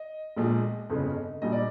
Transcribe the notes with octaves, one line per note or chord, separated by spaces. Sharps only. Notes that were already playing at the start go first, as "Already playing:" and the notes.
Already playing: D#5
A#1 A#2 F3 G#3
G1 F2 C#3
A#1 A#2 G3 D#5
D5